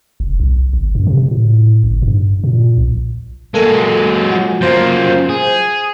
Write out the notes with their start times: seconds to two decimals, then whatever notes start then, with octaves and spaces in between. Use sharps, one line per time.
0.20 F1
0.40 B1
0.73 G1
0.95 F#2
1.07 C3
1.28 A2
1.84 G1
2.02 G2
2.44 A#2
2.78 A#1
3.54 F#3 G#3 A#3 A4
4.31 F3 F#4
4.61 F#2 A#3 F4 C5 G6
5.29 G#4